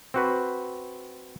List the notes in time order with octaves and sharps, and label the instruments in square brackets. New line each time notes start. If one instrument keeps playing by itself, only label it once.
[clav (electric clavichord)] C4 F#4 B4